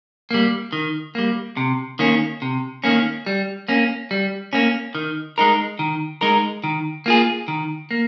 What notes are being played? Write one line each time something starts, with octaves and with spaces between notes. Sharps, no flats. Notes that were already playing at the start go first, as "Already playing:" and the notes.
G3 A#3
D#3
G3 A#3
C3
D#3 A#3 C#4
C3
D#3 A#3 C#4
G3
A#3 C#4
G3
A#3 C#4
D#3
G#3 D#4 A#4
D#3
G#3 D#4 A#4
D#3
A#3 F4 G#4
D#3
A#3